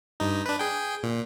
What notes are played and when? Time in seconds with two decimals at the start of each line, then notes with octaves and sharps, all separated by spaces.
0.20 G2 D#4
0.46 D4 B4
0.59 G#4 G5
1.03 A#2